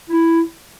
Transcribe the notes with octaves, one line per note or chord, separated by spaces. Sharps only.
E4